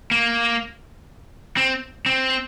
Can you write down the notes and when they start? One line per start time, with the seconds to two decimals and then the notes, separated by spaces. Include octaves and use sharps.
0.11 A#3
1.57 C4
2.06 C4